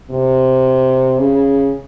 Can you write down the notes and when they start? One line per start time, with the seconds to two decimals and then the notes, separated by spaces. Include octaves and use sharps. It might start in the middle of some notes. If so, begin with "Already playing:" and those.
0.10 C3
1.19 C#3